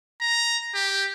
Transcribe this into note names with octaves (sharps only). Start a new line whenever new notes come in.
A#5
G4